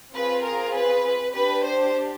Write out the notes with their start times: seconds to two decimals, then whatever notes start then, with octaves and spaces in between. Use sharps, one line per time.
0.15 C4 F4 G#4 B4
0.44 A#4
0.74 B4
1.35 D4 G4 B4
1.66 C5